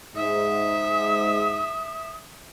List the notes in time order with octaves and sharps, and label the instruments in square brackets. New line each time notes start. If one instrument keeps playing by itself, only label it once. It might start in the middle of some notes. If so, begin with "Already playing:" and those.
[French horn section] G#2 [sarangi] E5 [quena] D#6